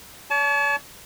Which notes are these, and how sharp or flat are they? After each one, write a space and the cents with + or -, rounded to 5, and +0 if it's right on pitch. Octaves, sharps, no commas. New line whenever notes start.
C#5 +45 A5 -25